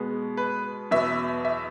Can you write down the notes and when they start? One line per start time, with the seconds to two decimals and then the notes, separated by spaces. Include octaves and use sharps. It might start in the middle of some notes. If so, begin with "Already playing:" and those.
Already playing: B2 G#3 B3
0.37 B4
0.91 E2 B2 F#3 B3 E5
1.45 E5